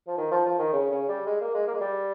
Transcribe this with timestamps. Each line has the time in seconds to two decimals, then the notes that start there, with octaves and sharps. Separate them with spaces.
0.07 F3
0.18 D#3
0.31 F3
0.46 F3
0.59 D#3
0.73 C#3
0.91 C#3
1.09 G3
1.26 G#3
1.41 A#3
1.54 G#3
1.67 A#3
1.74 G#3
1.81 G3